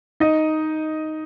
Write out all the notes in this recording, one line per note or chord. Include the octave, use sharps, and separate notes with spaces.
D#4 D#5